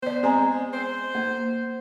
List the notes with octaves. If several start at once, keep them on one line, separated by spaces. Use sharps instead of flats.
B3 C5 D5
G#3 C4 G#5 A#5
C5
A#3